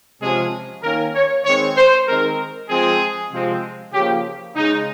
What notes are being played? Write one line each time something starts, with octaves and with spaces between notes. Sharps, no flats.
C3 F3 G#3 C#4 G#4
D#3 A#3 C#4 A#4
C#5
D#3 G#3 C4 C#5
C5
D#3 G#3 C4 A#4
F3 G#3 C4 G#4
C3 F3 G#3 C4
C#3 F3 A#3 C#4 G4
C#3 G#3 C#4 D#4